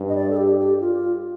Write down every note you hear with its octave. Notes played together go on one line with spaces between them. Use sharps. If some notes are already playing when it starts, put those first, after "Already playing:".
Already playing: G2
D#5
D5
A4
G4
G4
F4